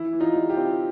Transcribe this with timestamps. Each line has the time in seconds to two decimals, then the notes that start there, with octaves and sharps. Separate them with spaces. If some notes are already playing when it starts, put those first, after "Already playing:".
Already playing: E3 E4
0.13 E3
0.20 D#4 F4
0.35 G3
0.49 F4 G4
0.57 C4